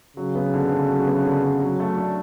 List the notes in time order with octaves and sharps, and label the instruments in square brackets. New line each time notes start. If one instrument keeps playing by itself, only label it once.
[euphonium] C#3 [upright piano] F#3
[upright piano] B3
D3
D3
F#3
B3
D3
D3
F#3
A3
D4